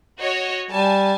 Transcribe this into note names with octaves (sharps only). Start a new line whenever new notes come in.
F#4 C#5 D#5
G3 G#5 A5